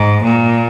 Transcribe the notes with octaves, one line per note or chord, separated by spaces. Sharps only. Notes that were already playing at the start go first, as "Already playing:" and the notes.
Already playing: G#2
A#2